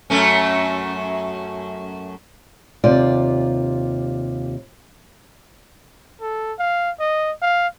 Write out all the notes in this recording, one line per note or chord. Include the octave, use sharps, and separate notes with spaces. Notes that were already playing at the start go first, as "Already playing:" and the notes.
F#2 A3 C#4
D#2 C3 F4 D5
A4
F5
D#5
F5